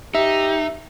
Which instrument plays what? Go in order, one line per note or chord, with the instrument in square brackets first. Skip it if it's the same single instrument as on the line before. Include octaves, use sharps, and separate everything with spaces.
[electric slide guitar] D#4 [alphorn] G4 [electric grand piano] E5